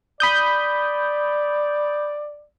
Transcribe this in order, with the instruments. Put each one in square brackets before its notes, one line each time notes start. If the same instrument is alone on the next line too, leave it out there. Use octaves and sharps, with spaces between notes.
[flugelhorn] D5 [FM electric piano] B5 D#6 G6